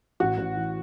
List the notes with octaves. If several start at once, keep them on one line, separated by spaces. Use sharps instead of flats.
A1 F#4
A1
E3